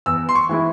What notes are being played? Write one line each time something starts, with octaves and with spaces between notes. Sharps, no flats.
E2 E6
C6
C#6
E3 G#3 E4